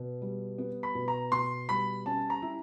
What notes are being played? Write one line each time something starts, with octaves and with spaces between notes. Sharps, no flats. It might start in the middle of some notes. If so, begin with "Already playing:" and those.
Already playing: B2
G3
B3
B5
B2
A#5
B2 C6
G3 B5
C#4 A5
A#5
E4